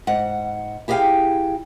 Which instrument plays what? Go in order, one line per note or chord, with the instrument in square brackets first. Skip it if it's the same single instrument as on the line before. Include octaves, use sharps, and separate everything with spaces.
[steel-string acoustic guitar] G#2 F#5
E4 G4 G#4 D#5 F5 G5